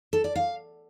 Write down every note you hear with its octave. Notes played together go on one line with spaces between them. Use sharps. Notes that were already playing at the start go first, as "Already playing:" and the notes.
A4
D5
F5